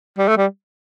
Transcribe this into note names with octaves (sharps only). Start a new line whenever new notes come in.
G3
A3
G3